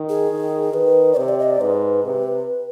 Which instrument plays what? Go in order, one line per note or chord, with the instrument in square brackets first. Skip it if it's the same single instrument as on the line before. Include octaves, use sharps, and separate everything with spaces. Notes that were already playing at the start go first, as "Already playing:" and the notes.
Already playing: [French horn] D#3
[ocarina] G#4
[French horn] D#3
[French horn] D#3 [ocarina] B4
[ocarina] D5
[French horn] C3 [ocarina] C5
[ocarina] D5
D#5
D5
[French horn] G#2 [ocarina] B4
[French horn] C3